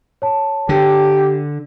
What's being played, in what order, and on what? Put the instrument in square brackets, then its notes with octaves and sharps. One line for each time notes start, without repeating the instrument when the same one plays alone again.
[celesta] C#5 A5
[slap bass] D3 [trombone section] G4